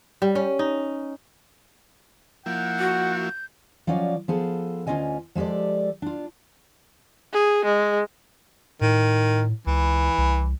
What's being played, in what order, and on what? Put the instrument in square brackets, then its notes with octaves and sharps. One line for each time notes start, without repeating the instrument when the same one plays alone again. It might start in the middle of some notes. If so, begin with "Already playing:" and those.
[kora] G3
C#4
D#4
[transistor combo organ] F3 A#3 E4 [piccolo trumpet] F#5 [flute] G6
[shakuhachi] F#4
[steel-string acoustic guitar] F3 F#3 C#4 F4 D5 D#5
F3 B3 G#4 A4 C5
D2 A#3 C#4 F4 D#5 G#5
F3 G#3 G4 A4 D5
D4 F4
[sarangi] G#4
G#3
[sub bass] A2 [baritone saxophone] D#3
[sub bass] C#2 [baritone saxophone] E3
[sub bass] C2